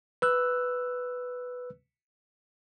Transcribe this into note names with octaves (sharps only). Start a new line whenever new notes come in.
B4 E6 F#6